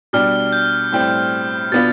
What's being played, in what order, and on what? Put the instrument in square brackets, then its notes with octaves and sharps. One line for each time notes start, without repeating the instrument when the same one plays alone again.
[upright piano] B2 G3 D4 [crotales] F6
[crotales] G6
[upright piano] A2 G3 C4
[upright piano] B2 B3 D4 F4 [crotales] A6